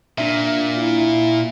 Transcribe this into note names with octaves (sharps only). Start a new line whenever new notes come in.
A#2 D4 E5
E4